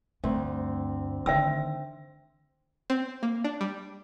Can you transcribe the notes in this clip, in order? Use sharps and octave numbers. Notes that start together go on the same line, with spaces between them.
D2 G2 C4
D3 D#3 E5 G5 E6
C4
A#3
D4
G3